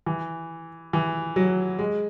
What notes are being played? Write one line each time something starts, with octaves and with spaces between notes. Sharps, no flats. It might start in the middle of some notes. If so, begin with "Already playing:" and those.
E3
E3
F#3
G#3